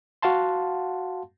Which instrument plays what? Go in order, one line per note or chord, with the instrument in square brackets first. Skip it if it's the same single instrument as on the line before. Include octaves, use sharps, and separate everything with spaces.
[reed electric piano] F#4 F5 F#5 A5 C6